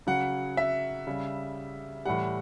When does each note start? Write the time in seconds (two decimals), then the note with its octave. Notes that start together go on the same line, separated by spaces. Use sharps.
0.07 C#3 F#3 F#5
0.57 E5
1.07 C#3 G3
2.05 A2 E3 G3 F#5